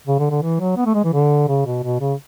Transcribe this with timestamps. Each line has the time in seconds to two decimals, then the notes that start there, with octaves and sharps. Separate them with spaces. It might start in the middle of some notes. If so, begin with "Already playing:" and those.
0.07 C#3
0.19 D3
0.31 D3
0.42 E3
0.60 F#3
0.77 B3
0.86 A3
0.94 G#3
1.04 E3
1.13 D3
1.48 C#3
1.66 B2
1.83 B2
2.00 C#3